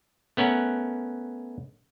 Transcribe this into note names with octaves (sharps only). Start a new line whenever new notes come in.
A3 B3 C#4 A#4 F#5